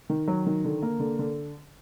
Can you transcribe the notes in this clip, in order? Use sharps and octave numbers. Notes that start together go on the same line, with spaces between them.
D#3
F#3
D#3
D3
A#3
D3
D3